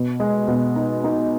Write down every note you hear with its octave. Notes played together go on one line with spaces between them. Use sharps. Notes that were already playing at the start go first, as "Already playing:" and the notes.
Already playing: B2
G#3
B2
D#4
D#4